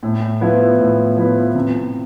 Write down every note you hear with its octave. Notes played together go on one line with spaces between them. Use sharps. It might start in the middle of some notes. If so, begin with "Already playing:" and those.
A2
F3 B3 E4 B4
A2
F3 B3 E4 B4
C3